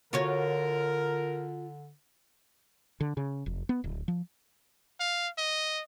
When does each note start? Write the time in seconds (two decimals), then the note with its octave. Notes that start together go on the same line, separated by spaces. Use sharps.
0.13 D3 F4 F#4 A#4 C#5
3.00 D3
3.17 C#3
3.46 F1
3.69 B3
3.84 D1
4.08 F3
5.00 F5
5.38 D#5